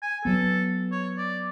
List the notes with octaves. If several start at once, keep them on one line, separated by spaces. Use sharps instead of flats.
G#5
F#3 B3 A4
C#5
D5